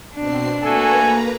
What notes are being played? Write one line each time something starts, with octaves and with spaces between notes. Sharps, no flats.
B2 C4 D4 C7
A3 A#3 F#4 A4 B4 G#5 A#5